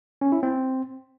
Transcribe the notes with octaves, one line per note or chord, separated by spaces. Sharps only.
C#4
E4
C4